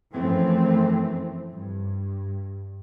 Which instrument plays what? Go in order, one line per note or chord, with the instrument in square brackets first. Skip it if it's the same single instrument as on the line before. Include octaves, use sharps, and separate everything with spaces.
[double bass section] F#2 E3 F3 A3 C4
G2